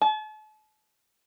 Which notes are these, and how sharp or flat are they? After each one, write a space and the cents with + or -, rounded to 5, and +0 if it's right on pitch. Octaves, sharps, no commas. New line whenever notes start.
A5 -40